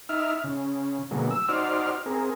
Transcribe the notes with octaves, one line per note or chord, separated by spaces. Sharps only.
D#4 E5 F6
C#3
B2 D3 F#3 G#3 A#3
E6
D#4 F#4 C5 D5 F6
C4 G#4 A#4